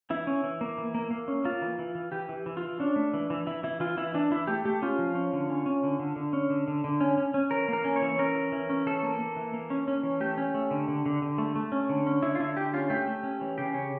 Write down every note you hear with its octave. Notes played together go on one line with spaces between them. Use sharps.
E3 E4
C#4
E3
A#3
E3
A#3
A#3
C#4
A#3 F4
E3
E3
E3
E3 G4
E3
E3
F4
E3
C#4 D4
A3
E3
E3
E3 E4
E3 E4
E3 F4
E3 E4
E3 D4
E3 E4
A3 G4
A3 G4
C#4 F4
F3
C#4
D3
C#4
C#4
D3
D3
D3
C#4
D3
D3
D3
C#4
C#4
C#4
E3 A#4
A#3 A#4
C#4
C#5
E3
C#4 A#4
E3
E3
C#4
E3 A4
A#3
A#3
E3
A#3
C#4
C#4
E3
A3 G4
C#4
A3
D3
D3
D3
D3
A3
A3
C#4
D3
C#4
D3 E4
F4
D3 E4
D3 G4
C#4 F4
A3 G4
A3
C#4
E3
C#3 G4
C#4